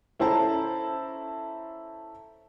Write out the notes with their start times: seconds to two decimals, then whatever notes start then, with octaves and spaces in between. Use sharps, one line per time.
0.19 C#4 E4 A4 C5 A5 A#5